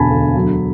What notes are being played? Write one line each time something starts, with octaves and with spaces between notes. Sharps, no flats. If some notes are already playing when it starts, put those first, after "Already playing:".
Already playing: E1 D2 D3 G#5 A5 B5
D2
F#3